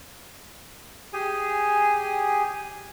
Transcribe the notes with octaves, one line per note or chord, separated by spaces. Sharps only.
G4 G#4 G#5